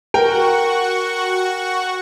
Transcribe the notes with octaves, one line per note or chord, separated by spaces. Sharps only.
F#4 A#4 F#5 G5 C#6